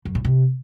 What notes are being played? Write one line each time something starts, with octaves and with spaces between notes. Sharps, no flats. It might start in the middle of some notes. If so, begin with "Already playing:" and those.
F#2
A2
C3